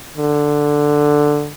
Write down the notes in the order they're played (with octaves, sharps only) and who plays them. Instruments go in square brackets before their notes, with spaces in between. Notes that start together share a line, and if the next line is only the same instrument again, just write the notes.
[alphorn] D3